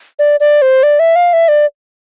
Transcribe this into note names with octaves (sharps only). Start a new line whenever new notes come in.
D5
D5
C5
D5
E5
F5
E5
D5